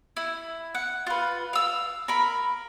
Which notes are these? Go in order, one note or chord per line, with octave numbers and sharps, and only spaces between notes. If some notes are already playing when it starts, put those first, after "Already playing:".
E4
F#5
F4 B4
F5 E6
A#4 B5